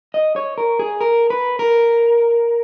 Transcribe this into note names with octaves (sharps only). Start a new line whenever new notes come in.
D#5
C#5
A#4
G#4
A#4
B4
A#4